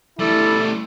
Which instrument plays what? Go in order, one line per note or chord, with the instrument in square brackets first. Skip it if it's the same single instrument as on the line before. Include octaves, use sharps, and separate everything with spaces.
[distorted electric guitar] G3 A3 [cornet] E4 [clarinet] A4